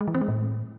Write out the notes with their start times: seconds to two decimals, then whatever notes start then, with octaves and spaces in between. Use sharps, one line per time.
0.01 G#3
0.08 E3
0.14 C4
0.21 G#3
0.28 A2